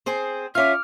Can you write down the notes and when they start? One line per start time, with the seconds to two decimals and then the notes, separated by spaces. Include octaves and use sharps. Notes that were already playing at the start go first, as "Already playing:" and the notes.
0.06 C4 G#4 C5
0.55 C#4 F4 E5 D6 F6